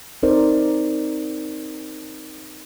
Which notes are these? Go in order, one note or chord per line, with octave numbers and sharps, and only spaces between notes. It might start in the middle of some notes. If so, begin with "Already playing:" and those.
C4 D#4 A#4 C5 D5